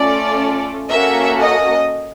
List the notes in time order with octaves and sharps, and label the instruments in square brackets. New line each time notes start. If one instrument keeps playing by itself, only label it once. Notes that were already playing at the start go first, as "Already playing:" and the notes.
Already playing: [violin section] A3 C#4 F4 A4 D5
A#3 C#4 F#4 A4 E5
D#5